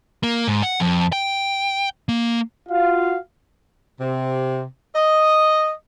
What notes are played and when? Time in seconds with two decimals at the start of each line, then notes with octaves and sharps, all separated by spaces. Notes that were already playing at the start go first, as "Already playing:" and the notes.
0.23 A#3
0.48 G#2
0.63 F#5
0.80 F2
1.12 G5
2.09 A#3
2.69 F4 F#4 F5
4.00 C3
4.95 D#5